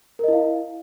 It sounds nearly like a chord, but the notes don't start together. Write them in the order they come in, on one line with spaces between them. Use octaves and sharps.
A#4 D#5 E4 F5